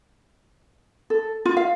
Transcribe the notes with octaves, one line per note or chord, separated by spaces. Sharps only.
A4
F4
F5